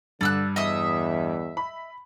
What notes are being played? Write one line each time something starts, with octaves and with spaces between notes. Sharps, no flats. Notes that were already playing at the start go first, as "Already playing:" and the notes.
G2 D3 D5 E6 F#6
E2 D#5 E5 D#6
B5